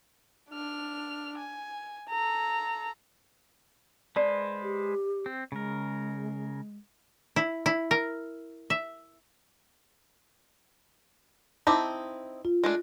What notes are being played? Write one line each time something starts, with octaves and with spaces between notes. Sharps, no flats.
D4 F6
G#5
A4 A#5
G#3 B4 C5 D5 A5
G4
C4
C#3 G#3 A#4
E4
E4
A#4
E5
C4 D#4 E4 A5 D6
F4
G#3 A3 D4